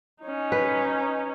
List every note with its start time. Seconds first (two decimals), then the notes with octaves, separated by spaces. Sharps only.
0.23 C#4 D#4
0.52 B4